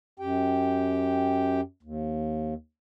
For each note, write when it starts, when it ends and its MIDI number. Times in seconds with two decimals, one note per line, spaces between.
0.20 1.61 42
0.20 1.61 67
0.20 1.61 79
1.83 2.54 39